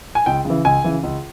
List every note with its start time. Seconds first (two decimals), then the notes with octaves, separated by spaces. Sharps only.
0.15 G#5
0.26 C#2 G5
0.45 C#3 E3
0.65 C#2 G#5
0.84 C#3 E3
1.03 C#2